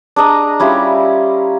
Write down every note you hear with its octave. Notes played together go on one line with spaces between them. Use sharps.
D4 G#4 D#5 A#5
G3 C#4 E4 F4